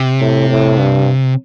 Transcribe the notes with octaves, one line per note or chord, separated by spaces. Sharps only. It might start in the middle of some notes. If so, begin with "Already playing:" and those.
Already playing: C3
A2
A2
G2